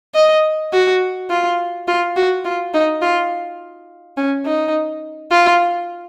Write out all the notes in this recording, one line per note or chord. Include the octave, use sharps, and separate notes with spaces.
D#5
F#4
F4
F4
F#4
F4
D#4
F4
C#4
D#4
F4